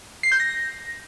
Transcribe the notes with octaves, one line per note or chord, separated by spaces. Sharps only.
C7
G6
A#6